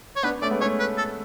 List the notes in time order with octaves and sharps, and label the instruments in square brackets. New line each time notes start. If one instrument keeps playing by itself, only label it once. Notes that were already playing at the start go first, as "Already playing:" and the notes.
[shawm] C#5
[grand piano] B3 D4 [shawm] B4
[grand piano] A3 C#4 [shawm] D5
[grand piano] G#3 B3
[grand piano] A3 C#4 [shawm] C#5
[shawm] B4
A4